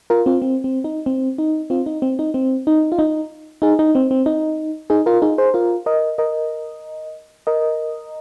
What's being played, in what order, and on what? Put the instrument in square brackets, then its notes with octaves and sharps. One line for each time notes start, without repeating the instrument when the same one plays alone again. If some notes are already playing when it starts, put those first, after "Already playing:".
[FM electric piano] F4 A#4
C4 F4
C4
C4
D#4
C4
D#4
C4 F4
D#4
C4
D#4
C4
D#4
F4
D#4
D#4 G#4
D#4
C4
C4
D#4
D#4 G#4
F4 A#4
D#4 G#4
G#4 C5
F4 A#4
A#4 D#5
A#4 D#5
A#4 D#5